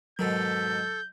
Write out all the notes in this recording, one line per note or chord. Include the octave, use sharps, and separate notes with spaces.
G#2 B2 D#3 F#3 A4 G6